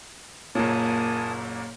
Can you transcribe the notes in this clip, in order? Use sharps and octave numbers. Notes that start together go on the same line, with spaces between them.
F#1 A#2 A#3 C#5 G#5 A5 D#6